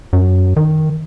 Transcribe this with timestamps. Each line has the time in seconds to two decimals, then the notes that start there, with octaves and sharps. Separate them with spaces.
0.13 F#2
0.57 D#3